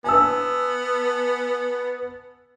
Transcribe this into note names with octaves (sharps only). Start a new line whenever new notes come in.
B3 G#5 A5 E6